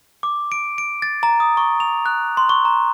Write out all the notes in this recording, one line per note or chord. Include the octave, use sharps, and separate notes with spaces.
D6
D7
D7
A6
A#5
D#6
C#6
F7
F#6
C6
C#6
A#5